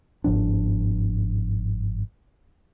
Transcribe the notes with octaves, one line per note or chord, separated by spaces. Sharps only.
G1 G#2 F3 D4